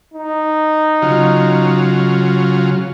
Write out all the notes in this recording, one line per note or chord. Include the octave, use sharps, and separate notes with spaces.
D#4
C#3 F#3 F4